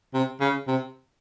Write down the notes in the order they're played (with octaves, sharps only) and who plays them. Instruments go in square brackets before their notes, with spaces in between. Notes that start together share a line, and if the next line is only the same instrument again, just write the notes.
[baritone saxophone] C3
C#3
C3